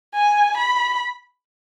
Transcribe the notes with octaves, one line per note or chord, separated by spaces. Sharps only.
G#5
B5